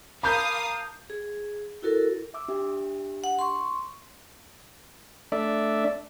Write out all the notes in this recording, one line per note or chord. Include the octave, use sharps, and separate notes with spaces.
A#4 F5 A5 B5 D6 D#6 G6
G#4
E4 F#4 A4 A#4
E5 D6 E6
D4 G4 E5
F#5
C6 C#6
A3 D4 D5 E5